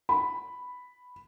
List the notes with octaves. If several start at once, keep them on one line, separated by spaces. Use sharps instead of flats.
B5